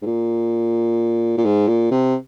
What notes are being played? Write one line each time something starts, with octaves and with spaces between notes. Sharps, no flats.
G#2
A#2
A#2
G#2
A#2
C3